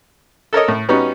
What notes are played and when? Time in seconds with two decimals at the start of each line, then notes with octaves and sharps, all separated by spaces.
0.53 A4 A#4 C#5 D#5
0.68 A2
0.89 G3 B3 C#4 D#4 F#4